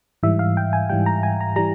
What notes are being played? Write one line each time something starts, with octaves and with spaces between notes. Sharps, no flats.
G#2 E3 G3 E5
F5
G5
G#5
G#2 E3 G3 G5
A#5
G#5
A#5
E3 G3 A#5